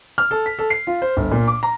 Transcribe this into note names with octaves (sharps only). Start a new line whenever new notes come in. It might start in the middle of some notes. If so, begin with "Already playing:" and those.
F6
A4
B6
A4
C7
F4
C5
G1
A#2
D6
A#5